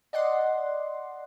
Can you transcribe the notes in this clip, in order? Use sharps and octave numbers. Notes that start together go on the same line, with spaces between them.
D5 D#5 F#5 C6